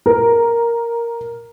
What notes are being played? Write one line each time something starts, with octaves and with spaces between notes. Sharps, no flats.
A#4